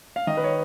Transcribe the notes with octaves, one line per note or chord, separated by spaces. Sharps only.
F5
D#3 D#5
B4
C#5